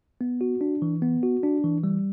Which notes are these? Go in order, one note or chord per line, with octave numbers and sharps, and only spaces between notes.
B3
F#4
D4
E3
B3
F#4
D4
E3
G3